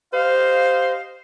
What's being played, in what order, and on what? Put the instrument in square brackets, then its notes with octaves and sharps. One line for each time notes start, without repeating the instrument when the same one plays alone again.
[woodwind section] G4 D#5 F5 [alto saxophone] C5